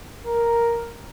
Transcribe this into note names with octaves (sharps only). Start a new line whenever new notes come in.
A#4